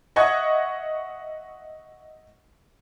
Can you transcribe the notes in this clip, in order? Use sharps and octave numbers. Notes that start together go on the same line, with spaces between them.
D#5 E5 F#5 C#6 D#6 G#6